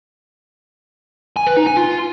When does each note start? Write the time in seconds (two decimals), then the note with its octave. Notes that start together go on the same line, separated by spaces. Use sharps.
1.36 G#5
1.47 B4
1.57 D#4
1.67 G#5
1.77 F4